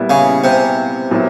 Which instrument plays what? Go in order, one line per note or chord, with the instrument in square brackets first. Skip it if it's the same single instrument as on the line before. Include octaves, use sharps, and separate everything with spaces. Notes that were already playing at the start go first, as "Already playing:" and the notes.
Already playing: [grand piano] A#2 G3 B3 E4
[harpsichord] C#3
C3
[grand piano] A#2 F#3 B3 E4